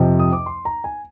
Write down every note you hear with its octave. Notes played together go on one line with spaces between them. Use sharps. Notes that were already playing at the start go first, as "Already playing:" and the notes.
Already playing: F2 C3 F3 D#5
D#6
D6
C6
A#5
G#5